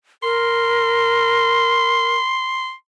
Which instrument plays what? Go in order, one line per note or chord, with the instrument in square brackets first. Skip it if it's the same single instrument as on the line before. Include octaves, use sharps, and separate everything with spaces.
[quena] A#4 [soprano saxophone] C6